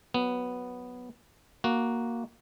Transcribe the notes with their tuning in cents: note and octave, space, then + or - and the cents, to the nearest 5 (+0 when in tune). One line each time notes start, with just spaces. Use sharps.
F#3 +0 B3 +0
A#3 +0 F#4 +0